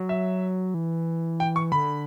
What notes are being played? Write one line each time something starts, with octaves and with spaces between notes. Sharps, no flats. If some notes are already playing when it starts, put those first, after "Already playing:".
Already playing: F#3
E5
E3
G5
C#6
D3 B5